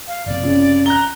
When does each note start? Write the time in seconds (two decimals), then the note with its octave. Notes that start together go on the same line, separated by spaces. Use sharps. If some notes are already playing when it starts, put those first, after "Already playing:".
0.07 F5
0.26 F#1 C3 D5
0.43 C#3
0.86 A#5 F#6 G7